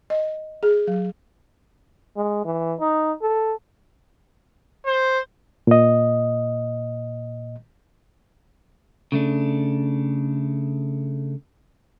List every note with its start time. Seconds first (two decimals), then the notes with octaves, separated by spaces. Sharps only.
0.10 D#5
0.63 G#4
0.87 F#3
2.16 G#3
2.45 E3
2.80 D#4
3.22 A4
4.86 C5
5.67 A#2 D#5
9.12 C#3 A3 D4